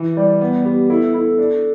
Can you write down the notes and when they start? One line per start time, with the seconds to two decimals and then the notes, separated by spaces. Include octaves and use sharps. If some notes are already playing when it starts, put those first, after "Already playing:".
Already playing: E3
0.17 G3 D5
0.41 B3
0.65 B3 G4
0.90 E4 A4
1.14 E4
1.38 D4